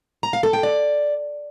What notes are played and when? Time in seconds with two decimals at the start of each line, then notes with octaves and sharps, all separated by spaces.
0.23 A#5
0.33 F5
0.43 A4
0.53 G5
0.63 D5